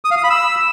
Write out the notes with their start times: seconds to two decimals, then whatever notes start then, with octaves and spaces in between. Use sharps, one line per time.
0.05 D#6
0.11 F5
0.17 D#6
0.24 B5
0.30 E6